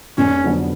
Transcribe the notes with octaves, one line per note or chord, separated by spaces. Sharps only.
F1 C#4
F2 D3 F#3 B3